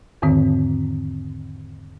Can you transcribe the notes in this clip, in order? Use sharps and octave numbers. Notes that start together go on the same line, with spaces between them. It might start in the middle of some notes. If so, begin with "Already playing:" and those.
E2 G#2 D3 D#3 C4